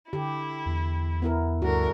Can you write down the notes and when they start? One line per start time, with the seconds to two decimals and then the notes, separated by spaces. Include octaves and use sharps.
0.13 D3 E4 G4
0.66 E2
1.22 B3 E4 A#4
1.62 D2 G2 D3 F#4 A#4